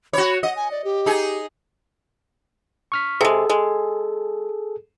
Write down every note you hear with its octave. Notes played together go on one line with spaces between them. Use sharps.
F#4 C#5 B5
D#5 F#5
G#5
D5
G4
D#4 G#4
C#6 F6 B6
C3 G#3 G#4 A4
G#3